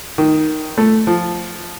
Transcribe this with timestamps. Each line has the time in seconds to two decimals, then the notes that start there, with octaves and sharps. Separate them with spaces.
0.18 D#3
0.78 A3
1.07 F3